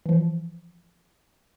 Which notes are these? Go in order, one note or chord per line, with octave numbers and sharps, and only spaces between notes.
E3 F3